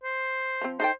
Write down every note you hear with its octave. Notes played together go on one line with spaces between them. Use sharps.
C5
F3 C4
D#4 A4 C5 G5